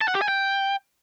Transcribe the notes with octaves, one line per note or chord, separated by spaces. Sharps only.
A5
F#5
G4
G#5
G5